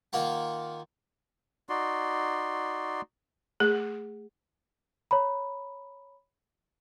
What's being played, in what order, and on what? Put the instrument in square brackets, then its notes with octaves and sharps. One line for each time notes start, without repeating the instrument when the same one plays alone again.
[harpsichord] D#3 A#3 F4 F#5
[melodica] D#4 F#4 D5 C6
[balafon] A3 G#4
[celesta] C#5 A#5 B5